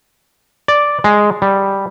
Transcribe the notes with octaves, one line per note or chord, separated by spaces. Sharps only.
D5
G#3
G3